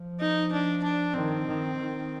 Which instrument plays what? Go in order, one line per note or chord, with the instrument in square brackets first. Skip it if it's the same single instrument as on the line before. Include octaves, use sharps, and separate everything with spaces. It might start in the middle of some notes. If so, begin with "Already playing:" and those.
Already playing: [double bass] F3
[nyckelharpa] D#4
D4
D4
[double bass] D#3 [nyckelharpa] C4
[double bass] D#3
D#3